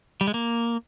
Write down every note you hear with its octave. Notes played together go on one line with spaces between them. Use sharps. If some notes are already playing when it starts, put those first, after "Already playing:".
G3
G#3
A#3